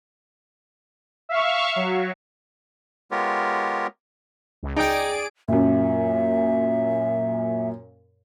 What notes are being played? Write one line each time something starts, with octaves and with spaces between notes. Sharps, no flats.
E5 F5 C#6
F#3
G#3 B3 F4 G4 A#4 C#5
C#2
D#4 G#4 D5 G5 D7
F#2 A#2 E5